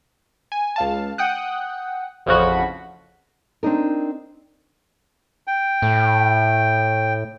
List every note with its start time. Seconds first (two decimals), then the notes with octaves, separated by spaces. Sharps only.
0.52 G#5
0.76 C#2 F5 A5
1.18 F#5 G5 D#6 F#6
2.26 A1 F2 C#3 F3 F#4 B5
3.63 C4 D4 D#4 A#4
5.47 G5
5.82 A2